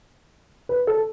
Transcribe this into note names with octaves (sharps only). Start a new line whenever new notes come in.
B4
A4